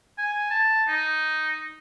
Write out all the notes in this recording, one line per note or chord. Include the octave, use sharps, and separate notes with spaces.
G#5
A5
D#4